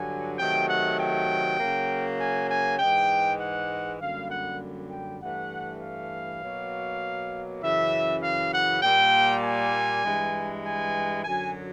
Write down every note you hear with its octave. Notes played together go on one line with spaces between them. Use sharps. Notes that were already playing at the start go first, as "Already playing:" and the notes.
Already playing: G2 D3 F#3 G#5
C3 D#3 F#3 A3 G5
F#5
G5
C#3 F#3 A#3
G#5
G#5
G#2 E3 G#3 G5
F#5
F#2 D3 G3 A#3 F5
F#5
G5
G2 E3 A3 F#5
F5
B2 F#3 A#3
F#2 C#3 E3 E5
F5
F#5
A#2 G3 A#3 G5
G#5
G2 E3 G#3
G#5
F#2 D3 F#3 G#5